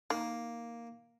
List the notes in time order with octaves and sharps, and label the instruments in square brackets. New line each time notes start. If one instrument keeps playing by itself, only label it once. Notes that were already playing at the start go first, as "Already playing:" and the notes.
[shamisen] D#3 [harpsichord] A#3